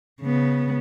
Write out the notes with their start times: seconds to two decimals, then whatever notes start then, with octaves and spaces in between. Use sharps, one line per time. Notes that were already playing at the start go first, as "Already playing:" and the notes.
0.22 C#3 B3